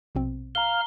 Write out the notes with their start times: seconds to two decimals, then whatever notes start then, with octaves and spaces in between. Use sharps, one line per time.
0.15 A#1 B2 C4
0.55 F5 A#5 F6 G7